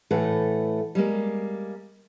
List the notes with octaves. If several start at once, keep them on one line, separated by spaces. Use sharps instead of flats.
A2 E3 A3 A4 B4 F#5
G3 G#3 A#3